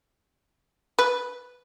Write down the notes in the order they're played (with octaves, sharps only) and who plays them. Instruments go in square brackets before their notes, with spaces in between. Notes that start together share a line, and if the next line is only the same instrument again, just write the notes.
[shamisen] B4